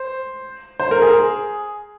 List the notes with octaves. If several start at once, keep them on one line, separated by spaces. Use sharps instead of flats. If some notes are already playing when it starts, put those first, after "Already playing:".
Already playing: C5
C5
A#4
G#4